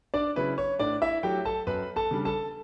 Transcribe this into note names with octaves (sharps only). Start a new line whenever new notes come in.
D4 D5
C#3 F#3 C#4 E4 B4
C#5
A2 D4 D5
E4 E5
F#3 A3 E4 G4 G5
A4 A5
F#2 B4 B5
A4 A5
C#3 G3 D4
A4 A5